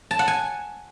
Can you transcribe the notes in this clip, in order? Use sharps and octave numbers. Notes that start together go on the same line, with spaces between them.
A5
F#5
G#5